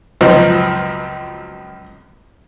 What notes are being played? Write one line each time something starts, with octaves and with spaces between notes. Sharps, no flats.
C#2 F#2 B2 F3 C4